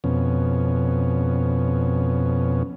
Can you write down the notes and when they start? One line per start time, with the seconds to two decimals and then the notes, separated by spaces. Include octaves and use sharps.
0.04 F2 B2 C#4